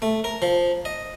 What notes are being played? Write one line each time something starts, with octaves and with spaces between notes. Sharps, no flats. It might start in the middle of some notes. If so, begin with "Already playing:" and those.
A3
A#4
F3
D#5